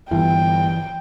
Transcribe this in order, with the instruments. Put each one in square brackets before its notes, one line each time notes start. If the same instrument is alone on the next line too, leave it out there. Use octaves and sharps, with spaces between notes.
[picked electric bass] G1 [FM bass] E3 [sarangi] G5